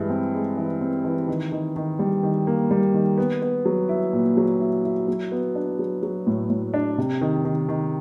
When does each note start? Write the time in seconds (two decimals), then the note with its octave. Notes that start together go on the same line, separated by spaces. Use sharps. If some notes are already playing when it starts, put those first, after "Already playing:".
Already playing: G2 E3 G#3
0.10 C4
0.34 G#3
0.57 E3
0.81 C4
1.05 E3
1.28 D#3
1.52 D#3
1.76 D#3
1.99 G3
2.23 D#3
2.47 A#3
2.71 G3
2.94 D#3
3.18 B3
3.42 B3
3.65 F#3
3.89 E4
4.13 A#2
4.37 F#3
4.60 E4
4.84 E4
5.08 F#3
5.31 B3
5.55 D4
5.79 F#3
6.03 F#3
6.27 A2
6.50 A2
6.74 D4
6.98 C3
7.21 D#3
7.45 D#3
7.69 D#3